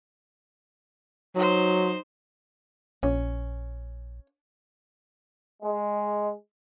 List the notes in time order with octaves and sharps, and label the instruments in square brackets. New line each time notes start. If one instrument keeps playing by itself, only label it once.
[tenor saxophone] F#3 [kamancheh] D#4 C5
[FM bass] A#1 [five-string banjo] C#4
[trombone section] G#3